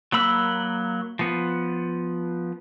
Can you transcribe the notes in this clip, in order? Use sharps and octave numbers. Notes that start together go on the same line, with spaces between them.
F#3 A#3 B5 E6
F3 B3